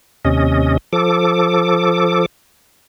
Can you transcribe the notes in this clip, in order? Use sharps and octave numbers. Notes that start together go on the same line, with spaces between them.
D#2 C3 C#4 D#5
F3 A4 D6